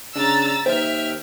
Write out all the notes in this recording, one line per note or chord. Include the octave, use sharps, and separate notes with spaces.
C#3 D4 A#5 E6 A6
D#2 C5 E5 G5 F6